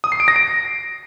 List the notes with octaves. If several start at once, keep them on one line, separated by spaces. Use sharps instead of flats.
D#6
C7
D7
A#6
D7